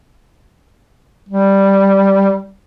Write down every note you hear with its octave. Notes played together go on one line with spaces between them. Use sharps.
G3